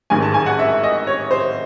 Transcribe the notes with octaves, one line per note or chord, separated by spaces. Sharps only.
A1 G#2 D#3 G#3 G#5
A5
G#5
F#5
E5
D#5
C#5
C5